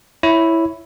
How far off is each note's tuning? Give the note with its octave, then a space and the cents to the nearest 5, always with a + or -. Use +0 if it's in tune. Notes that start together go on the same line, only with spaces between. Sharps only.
E4 +0 C#5 +0